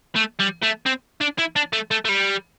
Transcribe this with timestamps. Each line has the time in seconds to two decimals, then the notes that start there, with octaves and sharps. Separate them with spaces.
0.15 A3
0.39 G3
0.62 A3
0.86 C4
1.21 D4
1.38 E4
1.56 D4
1.73 A3
1.91 A3
2.05 A3
2.09 G3